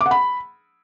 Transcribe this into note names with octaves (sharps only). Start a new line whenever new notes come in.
D6
F#5
B5